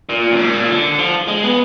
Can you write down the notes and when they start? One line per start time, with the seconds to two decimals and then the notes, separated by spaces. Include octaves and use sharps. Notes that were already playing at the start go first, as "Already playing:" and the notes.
0.09 A#2
0.32 F#2
0.39 G#2
0.53 A#2
0.69 D3
0.99 F3
1.28 G#3
1.44 B3